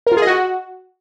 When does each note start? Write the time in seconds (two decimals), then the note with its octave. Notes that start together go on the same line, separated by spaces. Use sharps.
0.07 A#4
0.12 F4
0.17 G#4
0.22 D#5
0.27 F#4